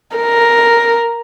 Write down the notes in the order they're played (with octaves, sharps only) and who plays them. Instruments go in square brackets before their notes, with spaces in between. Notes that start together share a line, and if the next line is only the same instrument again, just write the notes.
[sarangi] A#4